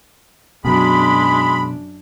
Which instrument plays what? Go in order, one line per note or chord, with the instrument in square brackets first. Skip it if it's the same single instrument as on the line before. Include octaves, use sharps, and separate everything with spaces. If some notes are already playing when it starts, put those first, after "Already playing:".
[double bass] F#2 D4 [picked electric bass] B2 F#3 [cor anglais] G#3 [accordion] B5